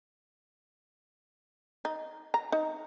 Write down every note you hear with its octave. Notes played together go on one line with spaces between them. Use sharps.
D#4
A#5
D#4